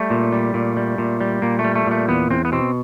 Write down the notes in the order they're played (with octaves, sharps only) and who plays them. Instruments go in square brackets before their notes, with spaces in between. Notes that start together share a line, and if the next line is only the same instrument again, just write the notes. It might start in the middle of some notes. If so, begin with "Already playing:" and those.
Already playing: [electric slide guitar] G3 A3
A#2
G3
A#2
G3
A#2
G3
A#2 A#3
A3
G3
A3
A#2 A3
E2 B3
E2 C4
B3
B2 C4